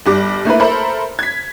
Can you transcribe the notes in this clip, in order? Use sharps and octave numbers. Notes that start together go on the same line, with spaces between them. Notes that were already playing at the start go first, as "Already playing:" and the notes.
G1 G3 D6
A3 A#3 E4 B4
A4 A#4 C5 E5 B5
G#6 B6